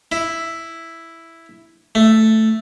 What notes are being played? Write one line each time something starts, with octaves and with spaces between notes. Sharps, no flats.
E4
A3